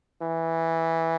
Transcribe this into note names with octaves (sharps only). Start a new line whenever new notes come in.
E3